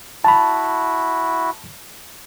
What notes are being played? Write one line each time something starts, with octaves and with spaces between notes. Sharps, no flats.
E4 F#4 A5 B5